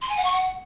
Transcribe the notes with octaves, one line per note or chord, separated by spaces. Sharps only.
C6
G#5
F#5
C#6
F#5